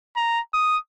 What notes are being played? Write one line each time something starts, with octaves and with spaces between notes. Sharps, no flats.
A#5
D#6